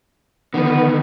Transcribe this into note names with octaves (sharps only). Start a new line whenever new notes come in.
D3 D#3 B3